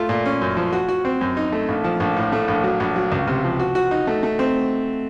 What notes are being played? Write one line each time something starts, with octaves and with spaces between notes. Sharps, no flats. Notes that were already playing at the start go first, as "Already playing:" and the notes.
Already playing: A3 F4
A#2
C#4
F#2
F3
F#4
F#4
C4
F#2
D#4
A3
A#1
F3
A#1
A2
A3
A#1
F#3
A#1
F#3
C#2
C3
F3
F#4
F#4
D#4
A3
A3
C4